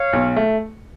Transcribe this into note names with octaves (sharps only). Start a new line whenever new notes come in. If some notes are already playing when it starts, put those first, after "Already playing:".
Already playing: C#5 F5
B1
A3